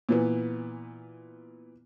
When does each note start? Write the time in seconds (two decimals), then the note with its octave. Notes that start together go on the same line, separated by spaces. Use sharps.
0.09 A#2 E3 B3